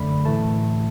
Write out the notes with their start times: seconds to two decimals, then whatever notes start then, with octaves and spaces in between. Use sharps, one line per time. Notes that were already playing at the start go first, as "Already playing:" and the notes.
Already playing: F#2 D3 A3 D5 B5
0.25 A2 E3 A3 A5